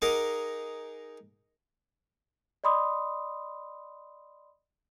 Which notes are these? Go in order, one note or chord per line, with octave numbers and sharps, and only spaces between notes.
D#4 G#4 A#4 F#5 A#5 D6
D5 D#5 B5 C6 D#6